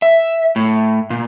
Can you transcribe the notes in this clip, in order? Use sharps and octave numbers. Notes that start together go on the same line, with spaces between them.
E5
A2
A#2